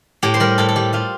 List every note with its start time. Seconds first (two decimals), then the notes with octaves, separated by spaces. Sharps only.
0.23 A2 G4
0.34 C5
0.40 G3 A#4
0.58 A2 A4
0.68 A4
0.76 G3 G4
0.93 G3 F4